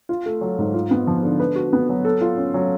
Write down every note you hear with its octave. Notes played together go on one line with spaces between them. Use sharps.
F4
A3
F#3
G#2
F4
B3
F3
D3
B4
F#4
B3
F#3
A4
F4
C#4
F#3